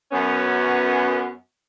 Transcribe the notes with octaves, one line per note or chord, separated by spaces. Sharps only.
F#2 B3 C#4